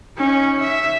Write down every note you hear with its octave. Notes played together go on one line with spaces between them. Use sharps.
C#4 D#4
E5